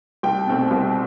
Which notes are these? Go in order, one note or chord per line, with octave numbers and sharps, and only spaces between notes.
C2 G5
B2 A3 C4
C2